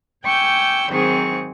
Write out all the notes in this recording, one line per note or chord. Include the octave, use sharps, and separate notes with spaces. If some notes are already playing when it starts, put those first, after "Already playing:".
G5 G#5 C#6 D6 E6 G6
G#2 D#3 F#3 C4 G#4 C#6